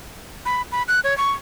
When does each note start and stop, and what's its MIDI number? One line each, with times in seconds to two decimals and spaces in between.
0.46 0.62 83
0.72 0.83 83
0.88 1.00 90
1.04 1.16 73
1.18 1.31 85